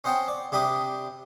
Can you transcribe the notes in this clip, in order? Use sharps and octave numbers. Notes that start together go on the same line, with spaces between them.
C#4 C5 D#5 F#5 G5 A5
D5
C3 D4 G4 B5 D6 D#6